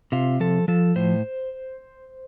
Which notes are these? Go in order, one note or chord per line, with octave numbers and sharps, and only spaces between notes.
C3 F4
F3 A4
F3 A4
A2 C5